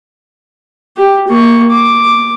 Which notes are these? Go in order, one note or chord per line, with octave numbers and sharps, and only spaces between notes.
G4
A#3 C#6
D6